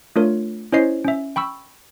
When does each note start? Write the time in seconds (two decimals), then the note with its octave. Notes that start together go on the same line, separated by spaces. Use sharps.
0.16 A3 D4 F4 A#4 C#5
0.72 C#4 E4 C5 C#5 D#5 C7
1.04 C#4 E5
1.36 G5 B5 C#6 E6